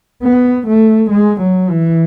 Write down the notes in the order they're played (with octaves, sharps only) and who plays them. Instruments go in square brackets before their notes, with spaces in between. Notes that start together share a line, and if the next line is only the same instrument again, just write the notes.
[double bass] B3
A3
G#3
F#3
E3